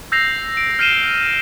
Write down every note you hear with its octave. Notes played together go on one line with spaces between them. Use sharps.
E6 G6 A#6 C7 F7
D7
F6 G6 C7 D#7 E7 G7